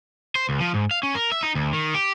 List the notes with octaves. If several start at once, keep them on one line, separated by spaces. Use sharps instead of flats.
C5
C#2
F3
G#2
F5
C#4
A#4
E5
D#4
D2
D#3
G4